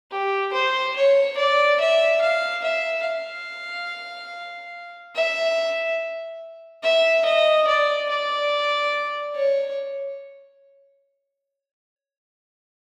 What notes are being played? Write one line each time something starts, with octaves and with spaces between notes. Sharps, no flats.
G4
C5
C#5
D5
E5
F5
E5
F5
E5
E5
D#5
D5
D5
C#5